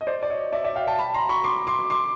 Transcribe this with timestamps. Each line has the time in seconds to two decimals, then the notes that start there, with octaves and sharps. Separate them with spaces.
0.01 D#5
0.07 C5 D5
0.23 D5
0.30 C#5 D#5
0.52 D5 E5
0.64 D5 E5
0.76 F5 G5
0.87 G5 A5
0.99 A5 B5
1.14 A#5 C6
1.29 B5 C#6
1.44 C6 D6
1.67 C6 D6
1.90 C6 D6